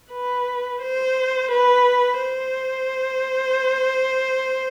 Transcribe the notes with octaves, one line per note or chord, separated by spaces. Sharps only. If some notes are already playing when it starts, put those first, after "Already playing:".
B4
C5
B4
C5